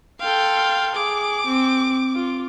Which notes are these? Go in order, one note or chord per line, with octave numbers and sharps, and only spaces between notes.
A4 F5 G5 C6
G#4 D6
C4
F4